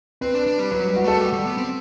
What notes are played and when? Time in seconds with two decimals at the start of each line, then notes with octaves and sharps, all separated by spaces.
0.21 C4 B4
0.34 D4
0.47 D4
0.59 G3
0.71 F#3 B4
0.88 G3
0.96 F#4
1.04 A3 A4
1.21 G3
1.33 G3
1.45 B3
1.57 C4